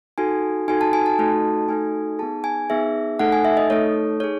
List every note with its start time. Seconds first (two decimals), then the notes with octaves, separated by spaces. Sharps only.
0.18 D#4 F#4 A4 G#5
0.68 D#4 F#4 A4 G#5
0.81 A5
0.93 G#5
1.06 A5
1.19 A3 D#4 F#4 A4
1.69 A3 D#4 F#4 A4 G#5
2.19 B3 D#4 G#4 A5
2.44 G#5
2.70 B3 D#4 G#4 E5
3.19 A3 D#4 A4 F#5
3.32 G#5
3.45 E5
3.57 D#5
3.70 A3 D#4 A4 C#5
4.20 D#4 G#4 C#5